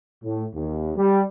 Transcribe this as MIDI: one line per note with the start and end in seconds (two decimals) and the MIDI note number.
0.24 0.43 45
0.55 0.91 39
0.97 1.22 55